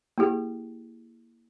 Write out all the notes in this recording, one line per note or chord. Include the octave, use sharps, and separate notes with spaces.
A#3 E4 G4 G#4